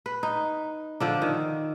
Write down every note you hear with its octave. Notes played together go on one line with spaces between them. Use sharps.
B4
D#4
D3 F3 D4
D#3